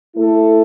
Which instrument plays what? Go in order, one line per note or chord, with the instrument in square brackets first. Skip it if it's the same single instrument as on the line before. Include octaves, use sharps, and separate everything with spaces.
[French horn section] A3 E4 A4